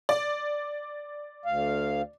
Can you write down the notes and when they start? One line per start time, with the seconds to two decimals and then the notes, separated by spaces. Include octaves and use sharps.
0.09 D5
1.46 D2 F5